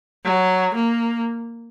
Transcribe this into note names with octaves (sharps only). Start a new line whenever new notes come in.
F#3
A#3